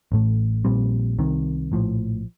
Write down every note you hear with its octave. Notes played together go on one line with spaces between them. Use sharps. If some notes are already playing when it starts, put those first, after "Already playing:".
A1 A2 A3
A#1 A#2 G3 C4
C2 C3 D#3
A#1 A2 F3